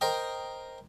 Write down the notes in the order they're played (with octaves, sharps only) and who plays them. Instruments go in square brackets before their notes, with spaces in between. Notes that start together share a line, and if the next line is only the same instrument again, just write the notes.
[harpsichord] A#4 C5 D#5 G5 D#6